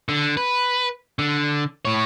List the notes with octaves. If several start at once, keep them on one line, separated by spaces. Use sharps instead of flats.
D3
B4
D3
A2 C#5